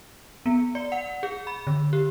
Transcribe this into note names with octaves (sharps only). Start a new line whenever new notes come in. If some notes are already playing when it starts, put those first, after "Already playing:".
B3
D5
F#5
G#4
B5
D3
G4